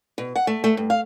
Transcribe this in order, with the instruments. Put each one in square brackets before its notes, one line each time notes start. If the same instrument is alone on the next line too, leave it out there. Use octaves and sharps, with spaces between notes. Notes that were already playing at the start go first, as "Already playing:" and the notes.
[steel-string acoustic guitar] B2
F#5
A3
A3
G2
F5